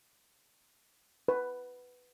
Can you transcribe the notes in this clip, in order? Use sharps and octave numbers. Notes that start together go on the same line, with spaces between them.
B4